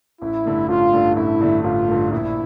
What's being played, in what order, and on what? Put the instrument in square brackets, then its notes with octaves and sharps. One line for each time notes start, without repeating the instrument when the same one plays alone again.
[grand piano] A1 [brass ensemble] E4
[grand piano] G2 D3 A3
[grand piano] A1 [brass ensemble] F4
[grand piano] G2 D3 A3
[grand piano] A1 [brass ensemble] E4
[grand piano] G2 D3 A3
[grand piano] A1 [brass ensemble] F4
[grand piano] G2 D3 A3
[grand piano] A#1 [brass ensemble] E4